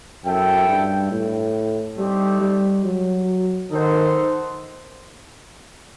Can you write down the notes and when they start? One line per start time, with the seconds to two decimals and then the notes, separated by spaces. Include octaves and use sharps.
0.25 F#2 E4 A4 E5 G5
0.69 G2
1.11 A2
1.98 G3 A3 C4 D#4 G4 C5
2.41 G3
2.85 F#3
3.71 D#3 D#4 A4 C5 F#5